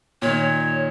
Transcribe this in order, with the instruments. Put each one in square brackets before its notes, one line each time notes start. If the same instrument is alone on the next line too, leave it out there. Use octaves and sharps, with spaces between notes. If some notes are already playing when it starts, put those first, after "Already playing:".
[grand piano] A#2 D#3 [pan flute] C#5